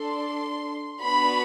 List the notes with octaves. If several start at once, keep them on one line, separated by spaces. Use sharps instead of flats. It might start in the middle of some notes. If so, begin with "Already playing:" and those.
Already playing: D4 A4 C6
B3 D4 F#4 B5